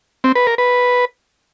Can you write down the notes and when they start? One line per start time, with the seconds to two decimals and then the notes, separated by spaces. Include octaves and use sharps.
0.24 C4
0.35 B4
0.47 A#4
0.58 B4